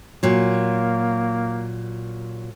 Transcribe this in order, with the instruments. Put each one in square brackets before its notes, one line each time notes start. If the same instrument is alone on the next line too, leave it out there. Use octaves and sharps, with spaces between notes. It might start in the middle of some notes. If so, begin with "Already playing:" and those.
[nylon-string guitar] A#2 F#3 [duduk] A#3